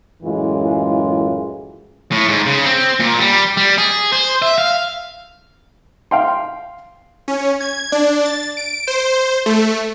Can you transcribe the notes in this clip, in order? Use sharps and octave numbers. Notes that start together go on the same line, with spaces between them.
F#2 A2 E3 G#3 C#4 F4
A2
G#2
C#3
C4
A#2
G3
G3
G#4
C5
E5
F5
F5 G5 C6
C#4
G#6
D4
A6
D7
C5
A3